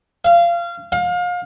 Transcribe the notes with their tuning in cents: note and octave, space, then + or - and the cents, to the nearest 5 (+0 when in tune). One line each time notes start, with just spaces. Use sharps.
F5 -25
F5 +30